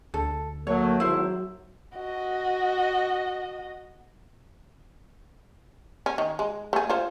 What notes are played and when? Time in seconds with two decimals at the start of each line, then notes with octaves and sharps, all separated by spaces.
0.14 D2 A4
0.67 F#3 A3 A#3 C#5
1.00 G#1 F#3 E4 C5
1.96 F#4 D#5
6.06 C#4
6.18 D#3
6.39 G#3
6.73 A3 G#4
6.89 F4 C5